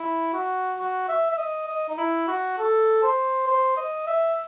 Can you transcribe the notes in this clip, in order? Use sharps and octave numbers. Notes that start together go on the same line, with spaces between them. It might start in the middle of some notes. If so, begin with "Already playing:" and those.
Already playing: E4
F#4
F#4
E5
E5
D#5
D#5
D#4
E4
F#4
A4
C5
C5
D#5
E5